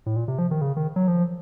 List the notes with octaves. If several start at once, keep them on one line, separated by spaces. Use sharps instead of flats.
A2
A#2
C3
F3
D#3
C#3
D#3
F#3
F3